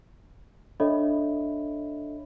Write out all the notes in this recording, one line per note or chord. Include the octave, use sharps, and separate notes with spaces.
D4 A4 C#5 D#5 E5 B5